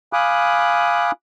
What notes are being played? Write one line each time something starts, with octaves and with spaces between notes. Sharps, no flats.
F5 G#5 B5 D6 D#6 F#6